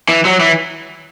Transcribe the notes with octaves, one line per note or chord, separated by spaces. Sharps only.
E3
F#3
E3